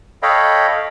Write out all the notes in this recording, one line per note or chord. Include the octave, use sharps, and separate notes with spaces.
A4 C#5 D#5 F5 G5 B5